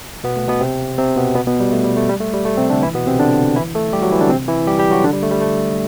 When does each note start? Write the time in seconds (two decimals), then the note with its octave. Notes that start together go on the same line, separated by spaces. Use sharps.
0.24 B2 B3
0.36 A3
0.48 B2 B3
0.61 C3 C4
0.98 C3 C4
1.16 B2 B3
1.35 B2 B3
1.47 B2 B3
1.60 G3
1.72 A3
1.84 G3
1.97 A3
2.09 G3
2.20 A3
2.33 G3
2.45 A3
2.57 C3 C4
2.70 D3 D4
2.83 E3 E4
2.94 B2 B3
3.06 C3 C4
3.19 D3 D4
3.56 E3 E4
3.75 A3 A4
3.93 G3 G4
4.02 F#3 F#4
4.11 E3 E4
4.21 D3 D4
4.30 C3 C4
4.48 E3 E4
4.67 G3 G4
4.79 G3 G4
4.91 F#3 F#4
5.04 D3 D4
5.13 G3
5.23 A3
5.31 G3
5.41 A3